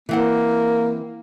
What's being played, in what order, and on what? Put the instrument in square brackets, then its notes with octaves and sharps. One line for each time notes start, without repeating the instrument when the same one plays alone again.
[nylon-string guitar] E3 C4 F#5 [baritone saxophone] A#3